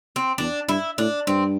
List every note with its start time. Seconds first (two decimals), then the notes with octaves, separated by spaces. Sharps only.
0.16 C4
0.38 E2 D4
0.68 G2 E4
0.98 A2 D4
1.27 G2 C4